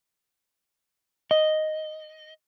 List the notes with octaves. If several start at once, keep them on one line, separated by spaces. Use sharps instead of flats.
D#5